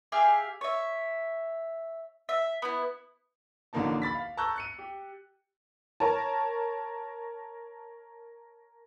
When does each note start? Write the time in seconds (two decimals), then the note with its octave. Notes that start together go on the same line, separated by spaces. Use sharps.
0.12 G4 G#4 E5 F5
0.61 C#5 E5
2.29 E5
2.62 B3 E4
3.73 A1 D3 F3 A#3 D#4 A5
4.02 B5 A6 B6
4.15 F5
4.37 A5 A#5 C#6 E6 F#6 G6
4.56 F#6 C#7 D#7
4.79 G4
6.00 A#4 C#5 A5